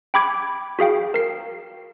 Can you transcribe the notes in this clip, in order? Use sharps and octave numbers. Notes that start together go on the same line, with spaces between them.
G5 B5 D6 G#6 D7
F#4 G#4 F5 G5
A#4 C7